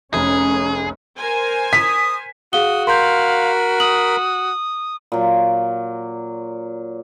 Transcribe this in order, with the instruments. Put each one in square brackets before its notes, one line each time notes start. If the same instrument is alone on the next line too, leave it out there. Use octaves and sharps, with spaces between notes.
[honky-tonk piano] F1 A#5 [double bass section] C#4 [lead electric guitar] G#4
[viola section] A#4 C5 G#5
[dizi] D#6 [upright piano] B6
[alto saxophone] F#4 [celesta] G#4 F5 G7 [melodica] D#6
[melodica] A#4 B5 [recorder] F5 [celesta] C6 G6
[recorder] D#6 [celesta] F#7
[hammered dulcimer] A#2 F#3